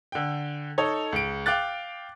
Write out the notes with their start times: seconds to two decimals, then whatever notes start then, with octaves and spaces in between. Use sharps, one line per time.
0.12 D3 G5
0.78 D#4 A4 C#5
1.13 C#2 D7
1.46 F5 G5 D6 F#6 A6